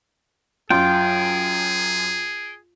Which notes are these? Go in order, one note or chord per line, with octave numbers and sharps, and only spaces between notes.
F#2 F4 G#4 G5